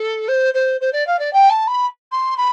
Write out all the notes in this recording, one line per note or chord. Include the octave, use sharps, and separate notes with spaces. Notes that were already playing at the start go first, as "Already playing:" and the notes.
Already playing: A4
C5
C5
C5
D5
F5
D5
G5
A5
B5
C6
B5